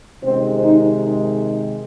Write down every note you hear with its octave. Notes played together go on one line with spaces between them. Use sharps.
C3 D#3 G#3 C4
D#4